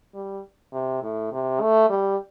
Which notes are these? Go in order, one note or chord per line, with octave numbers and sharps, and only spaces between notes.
G3
C3
A2
C3
A3
G3